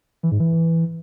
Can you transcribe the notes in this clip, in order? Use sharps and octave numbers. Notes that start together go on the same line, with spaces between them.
E3
G#2
E3